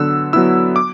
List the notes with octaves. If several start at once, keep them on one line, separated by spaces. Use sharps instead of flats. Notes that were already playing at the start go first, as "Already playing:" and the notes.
Already playing: D3 F#3 B3 E6 F#6
F#3 B3 E4 E6
D6